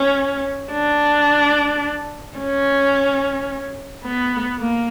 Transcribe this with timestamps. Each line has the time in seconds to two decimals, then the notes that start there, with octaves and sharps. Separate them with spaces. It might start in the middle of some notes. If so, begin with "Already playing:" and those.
Already playing: C#4
0.71 D4
2.38 C#4
4.04 B3
4.59 A#3